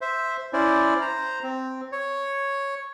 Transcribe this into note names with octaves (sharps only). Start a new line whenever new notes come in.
C5 E5
C#4 E4 C5 D5
C5 A#5
C4
C#5